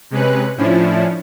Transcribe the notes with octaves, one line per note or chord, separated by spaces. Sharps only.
C3 G#3 C#4 B4 F#6
A2 F3 C#4 D4 E4